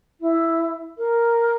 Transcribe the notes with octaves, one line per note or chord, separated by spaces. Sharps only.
E4
A#4